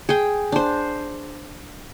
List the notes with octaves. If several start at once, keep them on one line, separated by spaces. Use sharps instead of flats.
G#4 G5
D4 C5